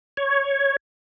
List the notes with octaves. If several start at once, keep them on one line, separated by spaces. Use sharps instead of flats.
C#5